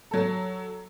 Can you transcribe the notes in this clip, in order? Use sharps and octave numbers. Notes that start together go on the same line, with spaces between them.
F#3 A4